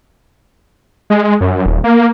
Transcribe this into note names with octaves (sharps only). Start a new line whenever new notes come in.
G#3
F#2
D#1
A#3